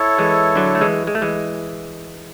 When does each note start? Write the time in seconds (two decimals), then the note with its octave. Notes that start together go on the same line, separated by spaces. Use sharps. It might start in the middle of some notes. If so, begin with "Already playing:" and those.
Already playing: E4 A4 C#5
0.18 E3 G#3
0.56 D3 F#3
0.75 A3
0.81 E3 G#3
1.07 G#3
1.15 A3
1.22 E3 G#3